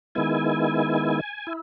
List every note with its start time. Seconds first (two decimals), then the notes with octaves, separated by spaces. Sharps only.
0.15 D#3 G#3 B3 E4 G#5
1.47 E4